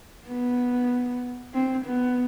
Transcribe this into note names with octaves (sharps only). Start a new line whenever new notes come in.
B3
C4
B3